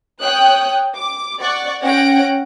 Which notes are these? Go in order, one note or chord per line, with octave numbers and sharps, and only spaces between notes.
C#5 G5 D#6 F#6
D6
D5 F#5 C#6
C#4 C#5 F#5 G5 A#6 D7